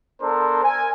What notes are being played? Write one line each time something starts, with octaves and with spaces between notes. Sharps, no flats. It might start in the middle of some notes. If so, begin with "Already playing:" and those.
B3 D4 A4 A#4 C5
A#4 G#5